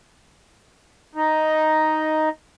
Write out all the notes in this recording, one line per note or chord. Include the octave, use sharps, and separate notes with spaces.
D#4